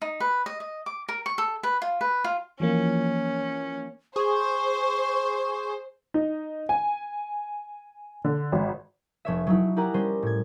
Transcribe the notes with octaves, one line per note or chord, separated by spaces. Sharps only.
D#4
B4
D#5
D#5
D6
A#4
C#6
A4
B4
F4
B4
F4
E3 F3 A#3 C#4
G#4 C5 C#6
D#4
G#5
D3
G#1
F1 C#5 E5
F#3 D#4 E4
E4 G4 A#4 F#5 G#5 A#5
G3 C#4 C5
A2 G#6